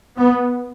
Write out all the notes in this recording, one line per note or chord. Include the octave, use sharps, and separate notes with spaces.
B3